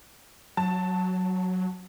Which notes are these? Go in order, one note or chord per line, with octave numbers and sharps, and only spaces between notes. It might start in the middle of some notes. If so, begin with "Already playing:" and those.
F#3 A5